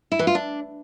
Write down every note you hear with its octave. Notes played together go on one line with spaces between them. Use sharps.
E4
E3
F4
D4